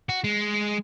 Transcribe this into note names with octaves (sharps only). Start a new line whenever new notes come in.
F#4
G#3